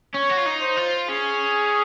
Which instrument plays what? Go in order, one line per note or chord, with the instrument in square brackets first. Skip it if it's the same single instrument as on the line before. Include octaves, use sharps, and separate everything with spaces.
[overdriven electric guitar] C#4 [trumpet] C#5
[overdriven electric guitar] F#4
F4
D#4
[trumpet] C5
[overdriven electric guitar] F4
[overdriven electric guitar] C#4 [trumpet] G#4